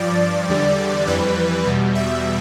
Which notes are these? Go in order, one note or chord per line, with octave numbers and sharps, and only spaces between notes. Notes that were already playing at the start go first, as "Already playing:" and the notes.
Already playing: G2 F3 D5
E2 D3 G3
F2 E3 G3 B4
E2 B2 G3
E5